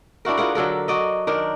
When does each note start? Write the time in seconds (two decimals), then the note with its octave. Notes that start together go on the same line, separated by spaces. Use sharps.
0.25 D4 E4 F#4 A#4
0.37 F4 G#4 A#4 F#5
0.55 D3 F#3 A4 A#4
0.88 F#4 D5 D#5
1.27 D#3 D4 A#4